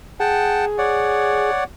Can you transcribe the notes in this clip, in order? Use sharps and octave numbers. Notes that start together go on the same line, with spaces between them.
G#4 F#5 G5 A5
C#5 D5 F#5